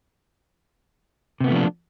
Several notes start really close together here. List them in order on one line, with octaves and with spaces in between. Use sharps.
C3 B3 A3 F3 D4